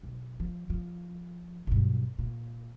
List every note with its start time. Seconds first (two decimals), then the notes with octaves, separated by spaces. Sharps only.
0.03 B1
0.40 F3
0.70 F3
1.67 B1 G2
2.19 A#2